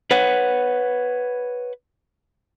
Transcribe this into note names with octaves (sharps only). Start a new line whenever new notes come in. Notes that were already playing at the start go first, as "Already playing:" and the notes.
B4 C#5 F#5